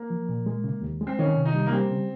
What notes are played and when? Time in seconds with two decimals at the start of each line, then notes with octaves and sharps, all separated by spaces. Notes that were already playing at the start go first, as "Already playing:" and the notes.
Already playing: A#3
0.10 F3
0.29 A#2
0.46 G#3
0.64 C#3
0.82 D#2
1.01 G#3
1.07 C4
1.19 D#3 C#4
1.36 C3
1.45 D#4
1.54 G3
1.67 A#3
1.72 G3 C4
1.91 C#3